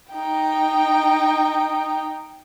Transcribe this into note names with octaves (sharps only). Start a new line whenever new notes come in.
D#4 G5